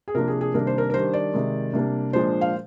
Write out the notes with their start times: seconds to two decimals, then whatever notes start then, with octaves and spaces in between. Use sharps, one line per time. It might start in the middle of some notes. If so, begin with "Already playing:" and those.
0.08 G#4
0.15 C3 F3 A#3 D4 A#4
0.28 G#4
0.41 G#4
0.54 C3 D#3 G3 A#3 D4 A#4
0.67 C5
0.78 A#4
0.90 A#4
0.94 D#3 G3 D4 C5
1.13 D5
1.34 C3 D#3 G#3
1.73 C3 G3 A#3 D4
2.13 A#2 F3 G#3 D4 C5
2.41 F5